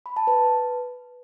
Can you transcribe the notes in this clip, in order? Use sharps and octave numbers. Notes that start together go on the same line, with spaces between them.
B5
A5
B4